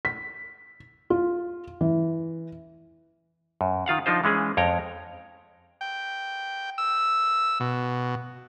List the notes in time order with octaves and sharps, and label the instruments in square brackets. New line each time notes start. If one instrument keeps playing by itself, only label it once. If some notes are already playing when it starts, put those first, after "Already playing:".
[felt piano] B6
F4
E3
[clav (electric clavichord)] F#2
D#3 F4 F5 F#5
F3 D4 D#4 F4 C5
E3 G#3 C#4 G#4
F2 C#5 G5 A#5
[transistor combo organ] G5
E6
B2